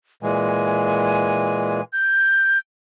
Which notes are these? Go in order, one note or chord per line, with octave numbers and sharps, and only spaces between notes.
A#2 E3 G#3 G#5
G6